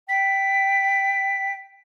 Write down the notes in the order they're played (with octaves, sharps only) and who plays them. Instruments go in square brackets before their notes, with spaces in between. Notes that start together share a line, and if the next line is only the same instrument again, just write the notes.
[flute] G5 [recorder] B6